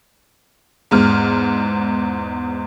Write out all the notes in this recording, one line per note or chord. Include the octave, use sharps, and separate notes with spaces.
E2 G#2 F6